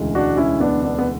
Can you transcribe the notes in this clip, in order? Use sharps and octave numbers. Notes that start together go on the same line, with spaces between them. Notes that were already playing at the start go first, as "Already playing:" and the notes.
Already playing: E1 D2 C#3 E3 G#3
D4 F#4
C#4 E4
B3 D4
B3 D4
B3